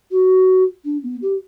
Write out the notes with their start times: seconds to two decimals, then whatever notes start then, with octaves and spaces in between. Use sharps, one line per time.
0.11 F#4
0.85 D4
1.03 B3
1.22 G4